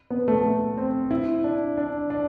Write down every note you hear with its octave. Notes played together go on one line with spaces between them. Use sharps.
B3
A3
A3
C4
E4
D4
D4
D4